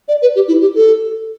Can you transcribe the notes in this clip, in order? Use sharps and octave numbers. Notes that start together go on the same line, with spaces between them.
D5
B4
G4
E4
G4
A4